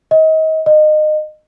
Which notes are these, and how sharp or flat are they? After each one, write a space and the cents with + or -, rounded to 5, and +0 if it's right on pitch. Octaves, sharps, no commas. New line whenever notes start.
D#5 +30
D#5 -25